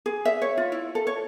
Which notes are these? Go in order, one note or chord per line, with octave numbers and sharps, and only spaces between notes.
G#4
E5
C#5
F4
E4
A4
C#5